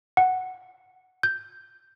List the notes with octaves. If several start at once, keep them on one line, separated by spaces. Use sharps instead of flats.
F#5
G6